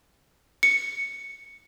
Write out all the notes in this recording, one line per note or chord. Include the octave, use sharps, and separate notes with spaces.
C#7